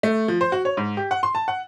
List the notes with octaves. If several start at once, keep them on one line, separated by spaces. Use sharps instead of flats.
A3
F3
C5
F#4
C#5
G#2
G4
F#5
C6
A5
F#5